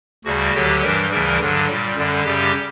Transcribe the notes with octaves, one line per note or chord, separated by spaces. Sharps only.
D2 C#3 G3 F#4
D2 D3 F#3 G4
G2 E3 G3 A#4
D2 C#3 E3 G3 A#4
G2 D3 F#3
A#2 G3
F#2 D3 G3
F#2 C#3 G3 G4